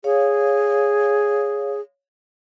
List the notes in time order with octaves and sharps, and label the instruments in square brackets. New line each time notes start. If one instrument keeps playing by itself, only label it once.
[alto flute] G#4 [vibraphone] C#5 F5